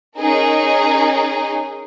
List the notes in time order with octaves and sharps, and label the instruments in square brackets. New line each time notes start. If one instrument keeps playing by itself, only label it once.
[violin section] C#4 D#4 G#4 A#4